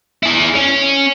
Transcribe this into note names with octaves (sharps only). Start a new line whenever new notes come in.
E4 G#4
C#4